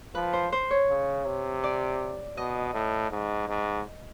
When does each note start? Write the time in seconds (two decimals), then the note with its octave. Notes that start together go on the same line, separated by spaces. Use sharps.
0.15 F3 B4
0.33 C5
0.52 C5
0.71 C#5
0.89 C#3
1.26 C3
1.64 D5
2.37 B2 D#5
2.74 A2
3.11 G#2
3.49 G#2